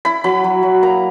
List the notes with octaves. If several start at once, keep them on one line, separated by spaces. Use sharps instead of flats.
E4 B5
F#3 B5
F#3
F#3
A#3 A#5